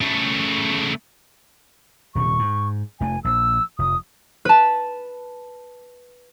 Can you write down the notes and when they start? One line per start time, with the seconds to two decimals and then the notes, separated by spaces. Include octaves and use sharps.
0.01 C#3 A3
2.15 D#1 C3 C#6
2.39 G#2
3.00 F1 A3 G#5
3.24 A#1 E6
3.79 F1 D#6
4.45 B4 A5